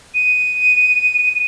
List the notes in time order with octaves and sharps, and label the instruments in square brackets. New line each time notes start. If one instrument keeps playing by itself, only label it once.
[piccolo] D#7